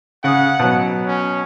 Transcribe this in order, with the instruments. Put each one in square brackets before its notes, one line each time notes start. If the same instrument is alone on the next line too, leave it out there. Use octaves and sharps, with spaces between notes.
[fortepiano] C#3 D#6 [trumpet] F#5
[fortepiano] B2 F#3
[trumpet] C#4